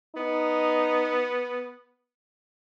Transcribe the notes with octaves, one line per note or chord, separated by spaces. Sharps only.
B3 D#4